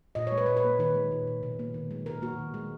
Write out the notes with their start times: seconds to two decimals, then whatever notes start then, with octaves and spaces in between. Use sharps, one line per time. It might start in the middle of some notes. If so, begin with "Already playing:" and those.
0.15 A#2 D#5
0.27 C#5
0.32 G#3
0.38 B4
0.46 A#2 C#5
0.57 B4
0.64 A#3
0.79 D#3 B4
0.95 G#3
1.11 A#2
1.27 G#3
1.43 B2
1.59 A#3
1.74 D#3
1.91 G#3
2.06 B2 A#4
2.22 A#3 F#4
2.39 D#3
2.54 G#3